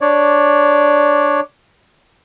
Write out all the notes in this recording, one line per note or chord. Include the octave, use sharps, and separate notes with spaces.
D4 C#5 D5